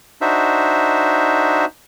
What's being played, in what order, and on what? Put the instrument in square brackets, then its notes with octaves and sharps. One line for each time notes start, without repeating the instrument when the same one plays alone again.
[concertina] D4 D#4 F#4 C5 E5